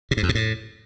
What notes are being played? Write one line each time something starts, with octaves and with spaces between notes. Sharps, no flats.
C3
G#2
F2
B2
A2